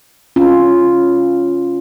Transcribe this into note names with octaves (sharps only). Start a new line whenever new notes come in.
C#4 F4